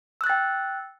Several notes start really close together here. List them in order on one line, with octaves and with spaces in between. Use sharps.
E6 F#6 A6 G5